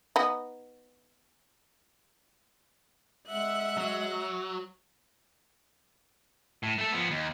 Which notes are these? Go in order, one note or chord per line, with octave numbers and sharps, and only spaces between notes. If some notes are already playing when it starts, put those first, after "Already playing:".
B3 D#4
G#3 E5 F#5 F#6
F#3
A2
A3 A4
F3 B3
D#2